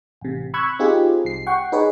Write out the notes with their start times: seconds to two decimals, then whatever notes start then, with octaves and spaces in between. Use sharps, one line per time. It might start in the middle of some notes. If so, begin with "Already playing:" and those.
0.21 A1 C3
0.54 B5 C#6 E6 F#6 G#6
0.79 C4 D#4 F4 G4 G#4
1.24 C2 C7
1.47 F#5 G5 C#6
1.72 D#4 G#4 B4 C#5